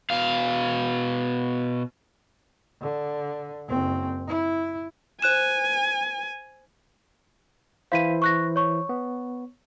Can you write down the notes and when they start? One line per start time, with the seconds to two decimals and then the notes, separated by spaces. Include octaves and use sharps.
0.10 B2 F5
2.81 D3
3.67 F#1 C4
4.28 E4
5.22 C5 G#5 F#6 E7
7.92 E3 E4 C5 F5 B6 D#7
8.22 C#6 F#6 A#6
8.56 C#5 C#6
8.89 B3